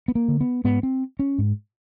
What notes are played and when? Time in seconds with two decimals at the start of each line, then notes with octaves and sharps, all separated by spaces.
0.08 B3
0.15 A#3
0.28 D3
0.41 B3
0.64 G#2 B3
0.83 C4
1.19 C#4
1.38 G#2